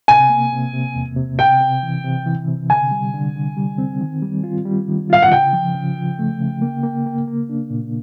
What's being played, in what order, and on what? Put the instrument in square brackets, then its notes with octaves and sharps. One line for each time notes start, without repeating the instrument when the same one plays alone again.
[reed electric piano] C3 [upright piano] G#5
[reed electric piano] A#3
C3
C3
E2
C3
[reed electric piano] C3 [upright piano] G5
[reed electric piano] C3
E3
C3
E3
C3
[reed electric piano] D3 [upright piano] G#5
[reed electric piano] G3
D3
D3
G3
C4
D#3
G3
F4
G3
D#3
[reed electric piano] F4 [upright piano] F5
[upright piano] F#5
[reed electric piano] C#3 [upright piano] G5
[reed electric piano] F3
C#3
F3
A3
C#3
A#3
A#3
A#3
A#3
D4
A#2